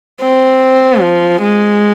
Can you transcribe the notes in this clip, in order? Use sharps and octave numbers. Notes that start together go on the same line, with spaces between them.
C4
F3
G#3